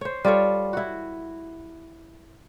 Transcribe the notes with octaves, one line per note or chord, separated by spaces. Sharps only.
C5 C#5
G3 F4 A4 C#5
E4 F#4